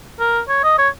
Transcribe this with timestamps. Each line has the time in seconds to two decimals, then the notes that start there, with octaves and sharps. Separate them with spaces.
0.19 A#4
0.49 C#5
0.64 D#5
0.78 C#5